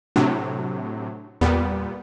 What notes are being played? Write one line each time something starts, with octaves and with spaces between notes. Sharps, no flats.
A2 C3 F#3 D4
E2 A#2 G3 B3